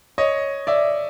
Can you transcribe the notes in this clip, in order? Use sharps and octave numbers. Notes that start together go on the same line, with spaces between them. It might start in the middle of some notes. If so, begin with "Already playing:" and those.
C#5 D#5
D5 E5